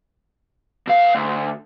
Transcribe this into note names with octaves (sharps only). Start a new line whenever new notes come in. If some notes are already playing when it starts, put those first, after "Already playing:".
B2 F5
D2